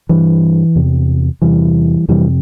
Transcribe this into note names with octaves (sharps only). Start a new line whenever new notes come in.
G2 E3
E2 C3
E2 C3 E3 G3
F2 C3 E3 G3